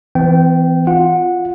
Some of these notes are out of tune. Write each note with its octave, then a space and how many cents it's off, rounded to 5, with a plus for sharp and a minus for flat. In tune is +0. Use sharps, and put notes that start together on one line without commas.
E3 +0 C4 -40 G5 -15
F4 +0 F#5 -15